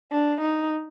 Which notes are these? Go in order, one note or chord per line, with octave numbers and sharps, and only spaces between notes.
D4
D#4